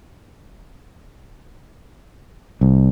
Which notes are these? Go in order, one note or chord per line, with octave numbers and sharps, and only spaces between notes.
C2